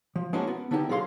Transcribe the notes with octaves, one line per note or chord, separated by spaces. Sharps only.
F3
G#3 A#3 C#4 D4 E4 F#4
B3
D3 B3 D#4 E4 F#4 G4
D3 F#3 G#4 F5 C6